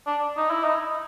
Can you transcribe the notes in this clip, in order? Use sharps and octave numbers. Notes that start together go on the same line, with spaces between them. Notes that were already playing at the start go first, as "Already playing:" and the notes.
D4
D#4
E4
D#4